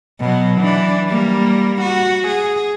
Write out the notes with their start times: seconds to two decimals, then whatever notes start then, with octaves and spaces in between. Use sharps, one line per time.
0.20 B2 F#3
0.61 E3 D4
1.08 G3 A#3
1.81 F#4
2.28 G#4